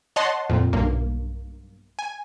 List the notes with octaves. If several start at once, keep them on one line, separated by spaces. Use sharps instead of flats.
C#5 D#5 F#5 A5 C6
F2 A#2
B1 G2 A#3
G#5